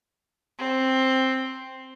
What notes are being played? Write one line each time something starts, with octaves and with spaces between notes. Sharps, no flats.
C4